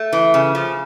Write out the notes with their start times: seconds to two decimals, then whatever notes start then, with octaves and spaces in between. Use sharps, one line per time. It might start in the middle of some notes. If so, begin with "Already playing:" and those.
Already playing: A3
0.13 E3
0.34 C#3
0.55 F3